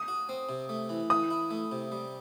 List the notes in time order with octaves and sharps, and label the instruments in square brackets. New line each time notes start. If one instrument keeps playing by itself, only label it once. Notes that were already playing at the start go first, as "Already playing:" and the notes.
Already playing: [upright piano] D#6
[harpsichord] F#4
C4
C3
A3
E3
[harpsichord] E3 [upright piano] D#6
[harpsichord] E4
A3
C3
G3